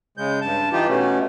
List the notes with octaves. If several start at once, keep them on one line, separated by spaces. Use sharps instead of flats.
C#3 G#3 G6
G2 A5
E3 D#4 F4 G4
B2 A3 C#4